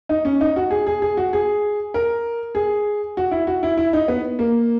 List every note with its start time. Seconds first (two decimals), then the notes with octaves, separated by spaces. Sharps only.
0.09 D#4
0.25 C#4
0.41 D#4
0.56 F#4
0.71 G#4
0.87 G#4
1.02 G#4
1.17 F#4
1.33 G#4
1.94 A#4
2.55 G#4
3.17 F#4
3.31 E4
3.47 F#4
3.63 E4
3.77 E4
3.93 D#4
4.08 B3
4.39 A#3